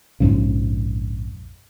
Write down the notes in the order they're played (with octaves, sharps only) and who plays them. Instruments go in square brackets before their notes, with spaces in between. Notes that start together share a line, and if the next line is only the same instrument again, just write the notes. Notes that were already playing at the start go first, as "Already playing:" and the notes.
[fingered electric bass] A#1 F2 G#2 C#3